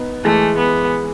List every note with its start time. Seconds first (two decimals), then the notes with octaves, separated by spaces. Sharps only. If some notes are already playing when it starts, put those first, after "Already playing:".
Already playing: B3 D#4
0.24 E3 G#3 A3
0.58 B3